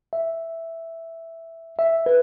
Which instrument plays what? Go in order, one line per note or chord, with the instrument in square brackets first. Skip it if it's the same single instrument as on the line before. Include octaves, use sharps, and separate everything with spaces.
[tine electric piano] E5
E5
B4